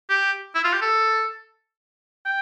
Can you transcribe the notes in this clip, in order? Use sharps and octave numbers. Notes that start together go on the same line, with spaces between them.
G4
E4
F4
G4
A4
G5